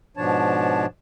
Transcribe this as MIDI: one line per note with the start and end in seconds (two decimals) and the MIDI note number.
0.17 0.86 44
0.17 0.86 47
0.17 0.86 53
0.17 0.86 62
0.17 0.86 73
0.17 0.86 81